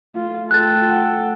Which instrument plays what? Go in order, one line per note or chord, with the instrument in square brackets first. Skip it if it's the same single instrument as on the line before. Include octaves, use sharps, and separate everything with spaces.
[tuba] A3 [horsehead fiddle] F4
[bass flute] F4 [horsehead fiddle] A4 G5 [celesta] F#6 A6
[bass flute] F#5